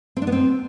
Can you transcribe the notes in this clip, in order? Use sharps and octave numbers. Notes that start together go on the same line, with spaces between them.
C4
D4
B3
C4